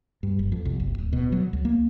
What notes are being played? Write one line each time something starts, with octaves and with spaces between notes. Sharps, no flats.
G2
F#1
F2
C2
F#1
D1
B2
F#3
C#2
A#3